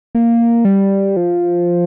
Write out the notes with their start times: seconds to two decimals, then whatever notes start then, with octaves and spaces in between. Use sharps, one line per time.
0.15 A#3
0.65 G3
1.17 F3